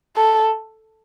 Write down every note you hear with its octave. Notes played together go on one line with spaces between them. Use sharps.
A4